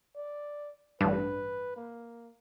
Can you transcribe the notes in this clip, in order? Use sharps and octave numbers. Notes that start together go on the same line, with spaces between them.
D5
A1 G2 B4
A#3